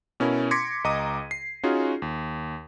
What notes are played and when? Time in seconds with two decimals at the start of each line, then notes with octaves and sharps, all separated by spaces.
0.20 B2 C#4 E4 A#4
0.51 C6 D6 G#6 A#6 B6 C#7
0.84 C#2 D#5 A#5 D6 D#6 D#7
1.31 C7
1.63 C#4 D#4 F4 F#4 G#4
2.02 D#2